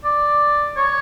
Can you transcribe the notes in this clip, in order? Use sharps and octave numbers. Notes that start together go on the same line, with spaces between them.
D5
C#5